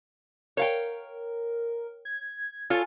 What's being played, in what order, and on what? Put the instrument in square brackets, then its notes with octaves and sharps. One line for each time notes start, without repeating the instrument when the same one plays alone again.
[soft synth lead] A#4 [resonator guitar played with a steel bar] C#5 F5 G5
[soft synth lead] G#6
[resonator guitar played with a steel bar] F4 A4 C#5 [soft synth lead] G#5